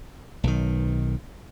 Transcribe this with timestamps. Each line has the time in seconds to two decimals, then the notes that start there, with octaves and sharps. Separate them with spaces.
0.44 B1 D#3